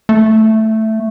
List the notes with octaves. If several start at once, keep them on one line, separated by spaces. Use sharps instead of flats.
A3